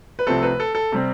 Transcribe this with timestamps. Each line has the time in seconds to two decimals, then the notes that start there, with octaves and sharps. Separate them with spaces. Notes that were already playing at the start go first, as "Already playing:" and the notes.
0.19 B4
0.27 C2 C3 F3 A3 C4 A4
0.43 B4
0.60 A4
0.75 A4
0.92 C3 G3 C4